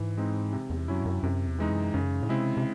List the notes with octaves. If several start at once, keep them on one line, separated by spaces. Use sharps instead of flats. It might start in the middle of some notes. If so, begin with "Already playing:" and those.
Already playing: G#2 E3
G#3 C4 D#4
C3
E2
F#2 F#3 C#4 E4
G#2
F#2
F#2 C3
E2
E3 G#3 D#4
F#2
F#2 C#3
A2
C3 G#3 C4 E4
C3